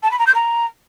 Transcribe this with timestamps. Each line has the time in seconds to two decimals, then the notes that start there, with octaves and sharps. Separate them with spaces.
0.03 A5
0.11 B5
0.19 A#5
0.26 G6
0.34 A#5